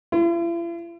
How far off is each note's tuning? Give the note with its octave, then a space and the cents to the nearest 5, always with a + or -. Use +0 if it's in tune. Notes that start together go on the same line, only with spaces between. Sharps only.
E4 +45